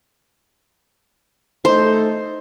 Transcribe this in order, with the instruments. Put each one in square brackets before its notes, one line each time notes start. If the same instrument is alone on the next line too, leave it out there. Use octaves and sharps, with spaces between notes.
[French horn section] A3 D#4 A4 [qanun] C5